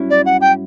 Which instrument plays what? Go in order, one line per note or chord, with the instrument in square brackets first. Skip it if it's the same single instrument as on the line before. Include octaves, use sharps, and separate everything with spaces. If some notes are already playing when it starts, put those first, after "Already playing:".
Already playing: [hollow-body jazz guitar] G2 F#3 C#4 E4
[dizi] D5
F#5
G5